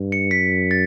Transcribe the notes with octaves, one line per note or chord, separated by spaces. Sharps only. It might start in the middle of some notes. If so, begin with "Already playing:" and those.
Already playing: G2
C#7
F#2 B6
A6